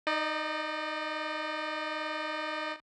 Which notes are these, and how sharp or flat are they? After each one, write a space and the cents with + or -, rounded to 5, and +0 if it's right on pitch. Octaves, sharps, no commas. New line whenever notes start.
D#4 +0 D5 +40